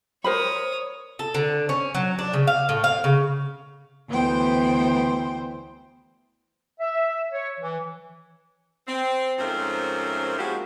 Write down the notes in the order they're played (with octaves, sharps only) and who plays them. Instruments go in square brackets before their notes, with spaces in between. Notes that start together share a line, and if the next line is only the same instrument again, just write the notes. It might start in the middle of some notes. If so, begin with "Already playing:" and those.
[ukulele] A#4 C5 B5 [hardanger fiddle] C#5 D#6
[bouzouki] A4
D3
C#4
F#3
D4
C#3
F5
A2
F5
C#3
[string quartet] D2 E3 B3 C5 G5
[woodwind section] E5
C#5
E3
[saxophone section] C4
G#2 F3 A3 C4 C#4 A#4
F3 G#3 A#3 E4 F#4 G4